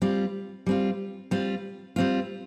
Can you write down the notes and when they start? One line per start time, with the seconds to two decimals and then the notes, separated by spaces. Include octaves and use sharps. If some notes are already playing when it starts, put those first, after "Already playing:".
0.02 G3 C4 F4
0.66 G3 C4 F4
1.31 G3 C4 F4
1.96 G3 C4 F4